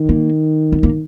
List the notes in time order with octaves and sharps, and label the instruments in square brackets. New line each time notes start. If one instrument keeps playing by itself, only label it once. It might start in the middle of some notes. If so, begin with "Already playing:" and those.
Already playing: [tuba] D#3
[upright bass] A#3
B3
A#3